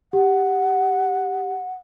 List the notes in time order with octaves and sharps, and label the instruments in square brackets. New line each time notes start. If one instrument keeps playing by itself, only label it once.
[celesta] G4 [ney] F#5